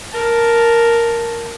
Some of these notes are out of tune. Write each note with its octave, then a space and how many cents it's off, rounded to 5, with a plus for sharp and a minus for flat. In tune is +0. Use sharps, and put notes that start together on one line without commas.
A#4 +0 A5 +0